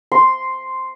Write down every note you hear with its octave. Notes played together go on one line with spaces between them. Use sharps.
C6